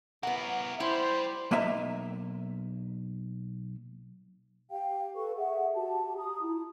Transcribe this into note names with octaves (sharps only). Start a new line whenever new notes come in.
B3 E4 A#4 F#5
G3 E4 C5
B1 A#3 D#5 E5 A#5
G4 F5 G5
A4 B4 C#6
G#4 E5 F#5
F#4 G4 A5
A#5 D#6
E4 F4